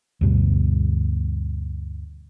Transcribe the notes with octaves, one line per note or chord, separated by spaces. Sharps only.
D2 G2 B2